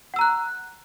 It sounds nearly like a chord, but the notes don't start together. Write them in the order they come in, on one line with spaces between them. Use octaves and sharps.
F#5 E6 A#5 F#6